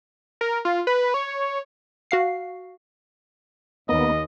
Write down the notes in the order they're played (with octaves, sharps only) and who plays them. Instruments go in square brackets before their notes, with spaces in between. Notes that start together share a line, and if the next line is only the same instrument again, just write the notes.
[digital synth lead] A#4
F4
B4
C#5
[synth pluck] F#4 F5 C7
[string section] D#2 [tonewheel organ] A#3 B3 [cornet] D#5